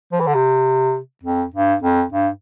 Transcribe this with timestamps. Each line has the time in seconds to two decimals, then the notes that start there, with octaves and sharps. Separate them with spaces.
0.12 F3
0.20 E3
0.27 D3
0.35 C3
1.23 F2
1.54 G2
1.82 F2
2.12 G2